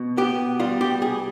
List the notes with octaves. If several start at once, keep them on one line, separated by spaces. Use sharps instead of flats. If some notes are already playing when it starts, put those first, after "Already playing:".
Already playing: B2
B3 G4
G3 F4
G4
C2 G#4